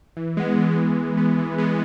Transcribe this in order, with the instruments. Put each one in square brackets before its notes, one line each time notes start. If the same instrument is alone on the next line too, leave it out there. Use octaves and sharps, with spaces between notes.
[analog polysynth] E3
G#3 B3
E3
G#3 B3
E3
G#3 B3
E3
G#3 B3